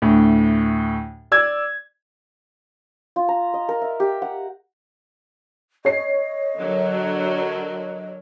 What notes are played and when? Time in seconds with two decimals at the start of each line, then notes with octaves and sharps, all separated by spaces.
0.02 D2 A2
1.32 D5 E6 G#6
3.16 F4
3.28 A#5
3.54 D#5
3.69 A#4
3.81 E5
4.00 G4
4.22 F#5
5.85 C#5 D#5 C7
6.58 D3 F#3 A#4